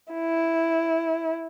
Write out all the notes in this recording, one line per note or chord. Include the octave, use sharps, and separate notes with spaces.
E4